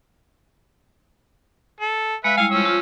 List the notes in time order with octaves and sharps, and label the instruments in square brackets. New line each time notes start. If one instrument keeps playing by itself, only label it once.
[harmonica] A4
[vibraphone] G#3 F5 [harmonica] B4 E5
[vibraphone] G3 G#3 E4 [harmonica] F5 G#5
[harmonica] F3 C#4 E6
[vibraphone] F4